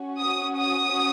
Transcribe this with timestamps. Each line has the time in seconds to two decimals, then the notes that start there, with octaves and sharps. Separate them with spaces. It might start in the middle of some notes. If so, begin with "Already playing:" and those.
Already playing: C#4 F#4
0.19 D#6
0.57 D#6